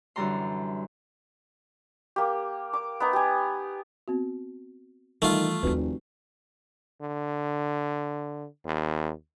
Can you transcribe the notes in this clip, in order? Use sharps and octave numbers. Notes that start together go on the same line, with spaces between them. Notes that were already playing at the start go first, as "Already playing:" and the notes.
F#2 D3 E3 G3 A#5 C6
A#3 G4
D6
B3 D#4 A#5
G4 G#5
B3 C4 F#4
D#3 E3 G3 A3 F4
F1 D#2 D4 F#4 B4
D3
D#2